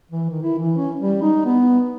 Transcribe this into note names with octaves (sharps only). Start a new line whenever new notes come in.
E3
D#3
E4
E3
C#4
G3
D#4
B3